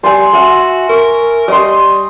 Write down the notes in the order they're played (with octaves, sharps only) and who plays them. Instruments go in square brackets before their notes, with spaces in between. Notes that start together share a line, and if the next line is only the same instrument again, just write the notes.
[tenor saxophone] G3 [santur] G#5 C6
[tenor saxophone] F#4 [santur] E5 G#5
[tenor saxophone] A#4 [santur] C#6
[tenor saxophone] G3 [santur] D#5 C6